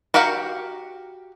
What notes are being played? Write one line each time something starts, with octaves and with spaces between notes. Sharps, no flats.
F#4 G4 A#4 F5 F#5